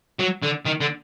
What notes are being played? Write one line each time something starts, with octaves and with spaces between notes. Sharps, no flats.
F#3
D3
D#3
D3